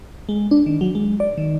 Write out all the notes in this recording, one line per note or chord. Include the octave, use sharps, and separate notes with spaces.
G#3
D4
D#3
F#3
G#3
D5
D#3